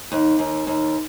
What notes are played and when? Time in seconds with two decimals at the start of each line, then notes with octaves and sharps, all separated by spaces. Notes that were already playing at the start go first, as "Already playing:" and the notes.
0.12 D#2
0.39 D#2
0.67 D#2